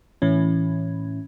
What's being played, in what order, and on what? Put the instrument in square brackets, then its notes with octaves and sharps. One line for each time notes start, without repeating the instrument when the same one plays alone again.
[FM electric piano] A2 E3 C#4